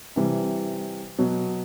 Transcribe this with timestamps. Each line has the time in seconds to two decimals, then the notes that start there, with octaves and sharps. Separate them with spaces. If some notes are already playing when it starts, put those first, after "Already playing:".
0.16 C3 E3 G3
1.19 B2 F#3